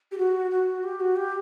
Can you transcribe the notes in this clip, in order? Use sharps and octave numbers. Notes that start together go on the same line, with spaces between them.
G4
F#4
F#4
G4
F#4
G4